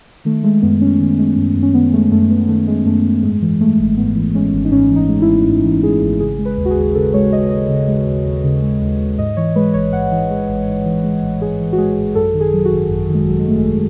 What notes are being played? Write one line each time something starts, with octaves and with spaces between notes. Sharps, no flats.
D#3 A3
G#3 A3
F#2 B3
F#2 C#4
D#3
G#3
F#2
F#2
C#4
D#3 B3
G#3 A3
F#2 A3
F#2 B3
D#3 A3
G#3
F#2 A3
F#2
G#2 G#3
E3
G#3 A3
G#1
G#2 B3
E3
G#3 C#4
G#1
D#4
G#2 C#4
E3
D#4
G#3
E4
G#1
G#2
E3
G#3 G#4
G#1
C#3 G#4
G#3
B4
D#2
F#4
G#4
D#2
C#3 A4
G#3 C#5
D#2 D#5
D#2 D#5
C#3
G#3
D#2
D#2
C#3
G#3
D#2
D#2
G#2 D#5
E3 C#5
G#3 B4
A1 C#5
G#2 F#5
E3
G#3
A1
G#2
E3
G#3
A1
G#2 G#4
E3
F#4
G#3 G#4
A1
F#2 A4
D#3
G#4
F#3
F#4
G#1
F#2
D#3
G#3
F#3
G#3
G#1 A3
G#3